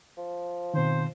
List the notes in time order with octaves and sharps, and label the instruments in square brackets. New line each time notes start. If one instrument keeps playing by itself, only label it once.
[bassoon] F3
[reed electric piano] B2 D#3 [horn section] C4 C5